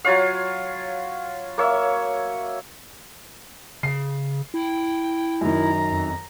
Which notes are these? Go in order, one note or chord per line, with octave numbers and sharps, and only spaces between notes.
F#3 F4 C#5 F5
A#3 C#5 E5
C#3 C7
E4 G5
F#2 D#3 A#5
F2